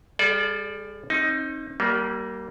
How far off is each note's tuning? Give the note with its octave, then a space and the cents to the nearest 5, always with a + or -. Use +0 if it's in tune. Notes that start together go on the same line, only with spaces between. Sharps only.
G3 +35 A4 -40 D5 +0
C4 +45 D#4 +10
G3 -30 A#3 +0